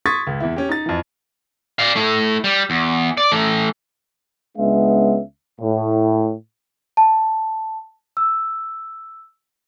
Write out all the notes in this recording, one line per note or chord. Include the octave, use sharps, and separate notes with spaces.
C6 C#6 D#6 G#6 A6 B6
C#2
E2 E4
C#4 G4
D#4 A6
F2 E3
D5 F5
A3 E4
G3
E2
D5
E3 A3
C#2 G#3 B3 C#4 D4 E5
A2
A5
E6